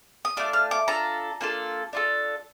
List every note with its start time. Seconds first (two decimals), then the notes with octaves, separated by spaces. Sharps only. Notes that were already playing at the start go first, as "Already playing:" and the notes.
0.25 D#6
0.37 A3 D4 F4 D6
0.53 F6
0.71 D6
0.88 D4 F4 A4 A#5
1.41 A#3 D4 F4 A4
1.93 D4 F4 A4